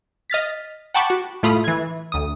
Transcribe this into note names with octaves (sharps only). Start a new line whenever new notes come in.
D#5 F6 A6 B6
F#5 G5 A5 B5 C#6 D6
F#4
A2 A3 F4 B5 D#6
E3 G#6
D2 D#6